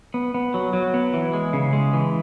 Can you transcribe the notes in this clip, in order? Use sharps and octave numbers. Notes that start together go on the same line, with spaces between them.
B3
B3
F#3
F#3
B3
E3
G#3
C#3
G#3
E3